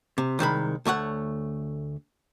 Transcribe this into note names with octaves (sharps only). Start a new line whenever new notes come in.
C3
C2 D#3 G#3 B5
D2 A3 C#5 F#5